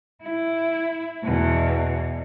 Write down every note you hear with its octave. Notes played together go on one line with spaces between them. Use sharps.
E4
E2 B2